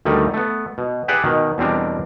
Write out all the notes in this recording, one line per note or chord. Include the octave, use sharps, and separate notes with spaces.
D2 D#3 G3 A3
A3 B3
B2
G4 G#4 B4 D5 E5 F#5
B2 D#3
E2 B2 G3 C4 D4 A#4